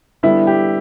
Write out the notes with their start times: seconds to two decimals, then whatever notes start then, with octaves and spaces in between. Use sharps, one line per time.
0.23 D3 G3 B3 E4
0.47 G4